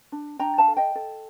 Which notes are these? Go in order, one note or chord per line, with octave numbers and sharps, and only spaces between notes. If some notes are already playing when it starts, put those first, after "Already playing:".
D4
D4 G5 A#5
F5 A5
A4
D#5 G5
A4